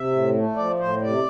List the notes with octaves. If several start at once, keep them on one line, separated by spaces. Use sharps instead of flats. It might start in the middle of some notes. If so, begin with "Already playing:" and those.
Already playing: C3 E5
A2
A3
F3 D5
A2 C5
C3 D5